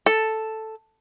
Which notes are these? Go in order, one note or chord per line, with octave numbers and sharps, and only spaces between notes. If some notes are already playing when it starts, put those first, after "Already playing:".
A4